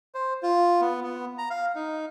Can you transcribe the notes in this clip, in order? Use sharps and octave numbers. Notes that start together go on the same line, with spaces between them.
C5
F4
B3
B3
A#5
F5
D#4